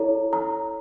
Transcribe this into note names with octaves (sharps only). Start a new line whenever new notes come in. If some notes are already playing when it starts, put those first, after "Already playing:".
Already playing: E4 A4 C#5 A#5
A#5